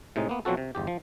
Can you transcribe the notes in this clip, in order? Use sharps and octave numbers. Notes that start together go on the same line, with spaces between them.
A2 C3 G#3 D#4
A#3 B3
B2 F3 F#3 C4 F#4 A4
C3
G1 E2 G4
F3